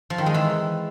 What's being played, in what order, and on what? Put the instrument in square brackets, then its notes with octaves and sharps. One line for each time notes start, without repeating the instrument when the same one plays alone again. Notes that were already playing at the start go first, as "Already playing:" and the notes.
[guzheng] F3
D#3
G#3
E3